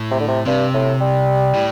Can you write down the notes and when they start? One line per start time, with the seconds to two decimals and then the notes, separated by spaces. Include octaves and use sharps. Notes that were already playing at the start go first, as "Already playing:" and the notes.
Already playing: A2
0.11 C3
0.20 D3
0.28 C3
0.46 G2 C3
0.74 A2
1.01 G3
1.54 A2